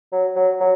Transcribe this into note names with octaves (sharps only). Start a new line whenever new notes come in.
F#3
F#3
F#3